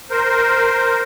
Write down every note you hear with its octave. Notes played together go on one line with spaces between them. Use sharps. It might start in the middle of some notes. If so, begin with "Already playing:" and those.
A#4 C5